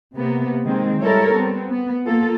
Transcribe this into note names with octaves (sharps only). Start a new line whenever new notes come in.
C3 A#3 B3
D#3 G#3 C4
G3 G#3 E4 A4 A#4 C#5
B3 C4
B3
A#3 F4 A4